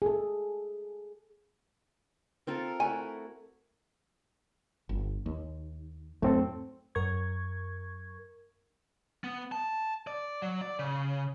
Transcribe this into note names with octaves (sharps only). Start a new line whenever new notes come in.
G#4 A4
C4 F4 A4 A#4
A3 E4 F#4 G#5
G1
D#2
F2 G#2 F#3 A3 C4 A4
F#2 A#4 C#6 G#6
B3
A5
D5
F#3
D5
C#3